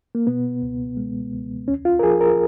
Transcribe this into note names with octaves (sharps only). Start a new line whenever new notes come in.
A#3
B2 B3
C#2
G#3
C#2
D#2 C#4
F4
A#4
F3 G#4
A#4